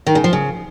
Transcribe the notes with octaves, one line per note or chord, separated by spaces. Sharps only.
D#3
C#3
F3
C#3